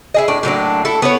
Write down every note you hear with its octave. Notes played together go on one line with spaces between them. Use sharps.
E4 G#4 D#5
A2 D4
A2 F#3 A#3 D4
E4 A4
B3 E4 C#5